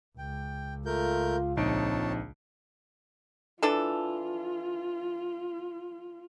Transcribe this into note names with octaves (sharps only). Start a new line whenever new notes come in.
C#2 G5
A3 F4 A#4 G6
A#1 F2 C4 D#4 C#5 A5 D7
E3 D4 F4 A4